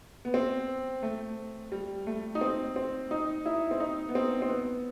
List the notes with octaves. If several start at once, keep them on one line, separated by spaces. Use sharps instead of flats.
B3
C4
A3
G3
A3
D#4
C4
C4
D#4
E4
C4
D#4
B3
C4
C4
B3